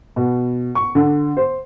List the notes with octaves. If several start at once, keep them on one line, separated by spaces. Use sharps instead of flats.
B2
C#6
D3
C5